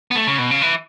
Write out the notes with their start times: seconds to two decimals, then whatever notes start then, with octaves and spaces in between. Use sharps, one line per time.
0.11 B3
0.15 A3
0.27 C#3
0.38 B2
0.51 C#3
0.62 E3